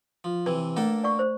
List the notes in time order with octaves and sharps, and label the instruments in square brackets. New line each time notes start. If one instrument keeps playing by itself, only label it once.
[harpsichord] F3
[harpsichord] C3 E3 [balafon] B4
[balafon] A3 [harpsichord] A#3 D4 A4
[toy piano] D5 F#5 C#6
C5